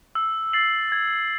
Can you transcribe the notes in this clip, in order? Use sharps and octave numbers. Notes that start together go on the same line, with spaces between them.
E6
A6 C7 F#7
G#6